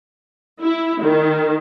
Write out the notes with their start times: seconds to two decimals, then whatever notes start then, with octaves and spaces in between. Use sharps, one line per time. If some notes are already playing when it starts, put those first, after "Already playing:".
0.62 E4
1.02 D#3